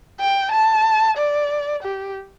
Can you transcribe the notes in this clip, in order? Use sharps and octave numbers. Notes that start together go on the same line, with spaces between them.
G5
A5
D5
G4